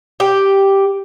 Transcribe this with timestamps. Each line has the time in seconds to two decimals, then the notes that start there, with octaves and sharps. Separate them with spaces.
0.20 G4